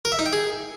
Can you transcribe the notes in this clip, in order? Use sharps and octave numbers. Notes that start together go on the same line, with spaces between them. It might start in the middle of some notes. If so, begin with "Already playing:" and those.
A#4
E5
D#4
G5
G#4